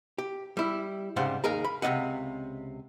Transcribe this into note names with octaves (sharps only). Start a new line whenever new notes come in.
G4
G3 E4
C2 G#2 C#3 G3 C5 F#5
D#2 D#4 G#4 A#4 A#5
B5
C#2 C3 D4 D#5 F#5